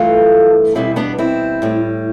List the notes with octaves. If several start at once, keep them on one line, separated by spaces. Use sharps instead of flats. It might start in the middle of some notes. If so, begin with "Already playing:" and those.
Already playing: G2 E3 A3 F4 A4
E2 B2 G3 C4 E4
B3 D4
C4 E4
A2 G3